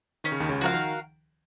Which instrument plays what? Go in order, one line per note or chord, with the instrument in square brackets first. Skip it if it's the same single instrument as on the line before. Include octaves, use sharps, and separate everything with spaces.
[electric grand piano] D#3 [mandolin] C#4
[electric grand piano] C#3
D#2 D#3
C#2 C#3
[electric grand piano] F3 [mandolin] F#4 A#4 F5
[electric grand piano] D#3